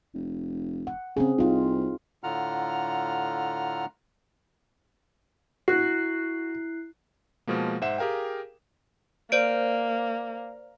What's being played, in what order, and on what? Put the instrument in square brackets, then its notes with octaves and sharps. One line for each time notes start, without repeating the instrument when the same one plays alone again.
[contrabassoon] F1
[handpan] F#5
[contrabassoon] C#3 [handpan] C4 G#4
[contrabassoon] C2 [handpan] D#4 F4
[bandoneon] A2 D3 F4 F#5 A#5 F6
[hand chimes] E4 F#6 C7 [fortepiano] F#4
[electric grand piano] B2 F3 G#3 A#3
G#2 C5 E5 F#5 E7
G4 G#4 A#4 F5 G5
[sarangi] A#3 [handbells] C5 D5 D7